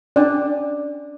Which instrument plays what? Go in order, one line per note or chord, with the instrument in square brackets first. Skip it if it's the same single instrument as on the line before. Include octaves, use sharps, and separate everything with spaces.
[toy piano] C#4 D4 [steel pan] D5